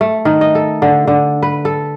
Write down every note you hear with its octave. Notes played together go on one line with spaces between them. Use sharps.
A3
D#3
D#5
A4
D3
D3
B4
A4